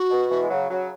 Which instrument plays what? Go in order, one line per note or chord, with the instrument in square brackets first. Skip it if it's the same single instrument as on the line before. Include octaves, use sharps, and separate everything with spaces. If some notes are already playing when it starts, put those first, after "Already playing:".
Already playing: [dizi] F#4
[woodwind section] B2
B2 E3
G#3
C#3 F#3
C#3 F#3